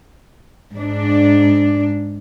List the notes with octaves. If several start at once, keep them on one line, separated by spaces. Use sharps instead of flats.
G#2 D4